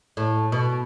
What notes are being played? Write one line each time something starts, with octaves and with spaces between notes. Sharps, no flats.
A2
B2